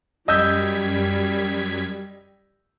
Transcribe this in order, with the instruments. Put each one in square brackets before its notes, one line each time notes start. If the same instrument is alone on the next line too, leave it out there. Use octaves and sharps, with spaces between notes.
[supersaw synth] F#2 G#6 B6 [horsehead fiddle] G3 [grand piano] D#5 E6 G6